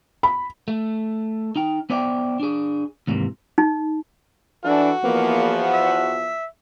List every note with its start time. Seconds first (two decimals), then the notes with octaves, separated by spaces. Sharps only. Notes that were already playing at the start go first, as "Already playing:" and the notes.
0.23 B5
0.68 A3
1.56 D#4 G5
1.90 B3 C5 D5 E5 F#5 G5
2.40 D4 G#4
3.07 D#2 G#2 C3 E3 A#3
3.58 D#4
4.65 E3 D4 F#4 A4
5.04 E2 F3 A#3 B3
5.73 E5